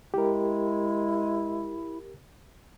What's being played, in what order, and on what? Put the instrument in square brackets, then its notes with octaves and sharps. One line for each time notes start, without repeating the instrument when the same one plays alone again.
[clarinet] G#3 [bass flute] E4 [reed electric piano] G4 A#4